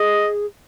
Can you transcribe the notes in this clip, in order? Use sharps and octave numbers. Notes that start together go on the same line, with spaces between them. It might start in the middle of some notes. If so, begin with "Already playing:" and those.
Already playing: G#4 D#5